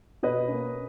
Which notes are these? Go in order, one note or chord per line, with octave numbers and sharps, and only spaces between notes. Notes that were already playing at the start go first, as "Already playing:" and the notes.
B2 B4 D#5
A#3 C#4